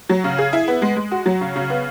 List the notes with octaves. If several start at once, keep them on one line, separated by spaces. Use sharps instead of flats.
F#3
C#3
G#4
E4
B3
G#3
G#3
F#4
F#3
C#3
C#3
B3